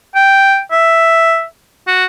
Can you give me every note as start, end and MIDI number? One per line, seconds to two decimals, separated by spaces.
0.15 0.60 79
0.71 1.43 76
1.88 2.05 66